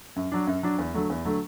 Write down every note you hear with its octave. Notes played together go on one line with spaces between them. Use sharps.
F#2
F#3 D4
F#2
F#3 D4
E2
D3 F#3 A3
E2
D3 F#3 A3